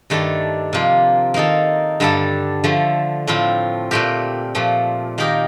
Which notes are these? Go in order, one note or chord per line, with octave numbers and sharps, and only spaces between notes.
G2 D#3 A3 D4 A4
C3 F3 A#3 F4
D#3 A#3 D#4 A4
G2 D3 G3 D4 A4
D3 F3 A3
A2 F3 C4 F4
A#2 A3 C4 G4 A#4
A#2 F3 A3
D#3 A#3 D#4 G4 A#4